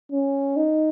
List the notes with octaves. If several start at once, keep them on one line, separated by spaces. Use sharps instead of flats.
C#4
D#4